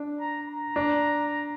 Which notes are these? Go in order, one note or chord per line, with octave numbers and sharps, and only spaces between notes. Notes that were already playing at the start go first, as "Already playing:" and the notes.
Already playing: D4
A#5
A#5
D4